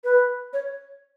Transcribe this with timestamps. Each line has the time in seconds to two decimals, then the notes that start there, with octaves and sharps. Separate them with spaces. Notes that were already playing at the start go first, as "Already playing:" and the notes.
0.04 B4
0.53 C#5